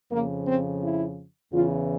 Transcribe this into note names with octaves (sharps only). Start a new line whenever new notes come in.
F2 C#3 F3 A#3
C4
E4
E2 C#3 E3 F4